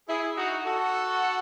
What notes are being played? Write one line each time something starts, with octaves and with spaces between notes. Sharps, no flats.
E4 G#4
D#4 F#4
F#4 A4